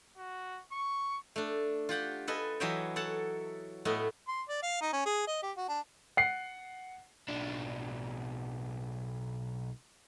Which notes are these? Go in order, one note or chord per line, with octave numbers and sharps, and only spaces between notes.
F#4
C#6
A3 D4
F4 G4 F#5 G5
A4 B4 D#5 G#5
E3 F#3 C#5 D#5 E5 G5
A4 C#5 F#5 A5
A2 A3 B3 D#5
C6
D5
F5
D#4
C#4
G#4
D#5
G4
F#4
D4
F#5 C7
B1 D4